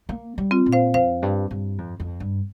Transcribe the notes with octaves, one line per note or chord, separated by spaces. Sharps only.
A#3
G3
C4 F4
A#2
C5 F5
F2 C5 F5
G2
G2
F2
F2
G2